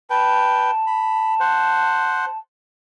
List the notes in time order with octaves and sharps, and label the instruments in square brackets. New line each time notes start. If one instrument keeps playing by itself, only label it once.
[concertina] B4 G5 [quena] A5
[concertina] B5
C5 F#5